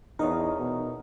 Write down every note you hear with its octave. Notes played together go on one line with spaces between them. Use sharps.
E2 D#4 A#4 C#5 D#5
B2